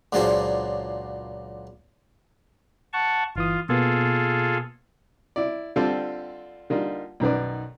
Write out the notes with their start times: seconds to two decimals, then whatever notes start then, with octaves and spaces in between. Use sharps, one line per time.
0.13 C#2 A#2 F#3 D4 G#4 C5
2.93 F#5 A5 C#6
3.36 G1 E3 F4 D#6
3.69 B2 A#3 B3 F4 G#4 A4
5.36 E4 D5
5.76 D3 G3 C4 F4 A4 D5
6.70 D3 G3 A#3 D#4 F4
7.20 B1 F#2 D#3 B4 D5